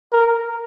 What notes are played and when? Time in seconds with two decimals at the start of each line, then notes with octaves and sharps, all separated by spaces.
0.13 A#4